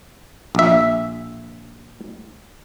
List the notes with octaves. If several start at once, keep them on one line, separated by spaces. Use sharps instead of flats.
A#1 E5